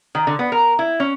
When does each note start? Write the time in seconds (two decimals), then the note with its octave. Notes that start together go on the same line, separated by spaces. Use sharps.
0.15 D#3
0.27 D3
0.39 B3
0.52 A#4
0.79 E4
1.00 C#4